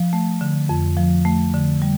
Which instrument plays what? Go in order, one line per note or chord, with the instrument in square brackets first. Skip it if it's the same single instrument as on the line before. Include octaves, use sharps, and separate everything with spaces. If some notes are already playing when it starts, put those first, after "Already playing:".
Already playing: [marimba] F3
A3
D3
F2
F3
A3
D3
G3